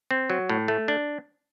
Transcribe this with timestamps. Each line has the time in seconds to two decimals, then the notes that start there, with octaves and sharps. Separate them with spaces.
0.11 C4
0.30 F#3
0.49 A2
0.68 A3
0.88 D4